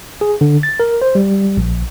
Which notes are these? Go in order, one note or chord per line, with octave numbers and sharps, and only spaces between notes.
G#4
D3
A6
A#4
C5
G3
A#1